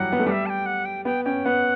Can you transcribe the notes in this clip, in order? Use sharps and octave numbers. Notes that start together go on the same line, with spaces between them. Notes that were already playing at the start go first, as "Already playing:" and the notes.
Already playing: E3 F#3 G3 F#5
B3
A3
G3 F#5
E5
A5
G5
F#5
G5
B3 G5
C#4 G5
B3 F#5